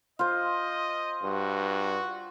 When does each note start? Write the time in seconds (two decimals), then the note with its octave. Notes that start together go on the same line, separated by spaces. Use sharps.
0.19 F4 C5 D#5
1.23 G2 F#4